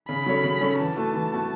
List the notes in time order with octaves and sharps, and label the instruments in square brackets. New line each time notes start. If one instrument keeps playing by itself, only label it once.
[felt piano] C#3 [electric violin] B5
[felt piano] F#3 C#4 A4 C#5
C#3
F#3 C#4 A4 C#5
[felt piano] E3 [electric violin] A5
[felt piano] A3 F#4 A4
E3
A3 F#4 A4